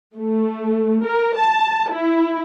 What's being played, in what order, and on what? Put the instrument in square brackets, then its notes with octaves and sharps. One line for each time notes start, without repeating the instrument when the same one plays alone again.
[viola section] A3
A#4
A5
E4